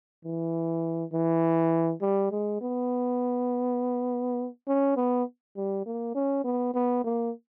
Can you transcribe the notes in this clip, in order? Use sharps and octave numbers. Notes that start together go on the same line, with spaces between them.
E3
E3
G3
G#3
B3
C#4
B3
G3
A#3
C#4
B3
B3
A#3